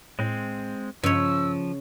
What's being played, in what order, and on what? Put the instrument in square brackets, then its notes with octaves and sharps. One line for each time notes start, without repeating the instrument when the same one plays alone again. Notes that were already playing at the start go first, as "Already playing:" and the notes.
[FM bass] A2 [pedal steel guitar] G#3 C4
[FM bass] G2 [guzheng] C#3 C#5 [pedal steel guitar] F3 [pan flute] E6